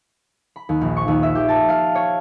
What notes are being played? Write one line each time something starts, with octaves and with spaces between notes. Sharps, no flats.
B5
D#2
A#1
C#6
D#2
E5
G4
A5
F5
C#5